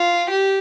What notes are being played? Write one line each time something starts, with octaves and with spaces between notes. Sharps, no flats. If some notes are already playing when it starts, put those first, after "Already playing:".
Already playing: F4
G4